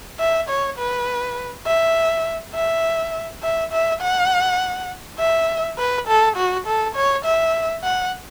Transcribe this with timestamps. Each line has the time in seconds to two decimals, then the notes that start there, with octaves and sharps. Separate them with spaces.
0.20 E5
0.49 C#5
0.78 B4
1.67 E5
2.55 E5
3.43 E5
3.72 E5
4.02 F#5
5.20 E5
5.78 B4
6.08 A4
6.37 F#4
6.67 A4
6.96 C#5
7.25 E5
7.84 F#5